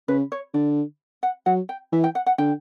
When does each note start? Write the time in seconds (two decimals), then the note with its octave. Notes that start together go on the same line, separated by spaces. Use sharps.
0.08 C#3 B4
0.32 C#5
0.54 D3 D5
1.23 F#5
1.46 F#3 F#5
1.69 G5
1.92 E3 E5
2.04 G5
2.15 F#5
2.26 F#5
2.38 D3 G5